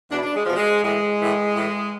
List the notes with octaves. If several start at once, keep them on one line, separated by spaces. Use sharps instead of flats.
E2 B2 D4
E4
D4
G#3
E2 B2 F3
G#3
A2 E3 G#3
A2 E3
A2 E3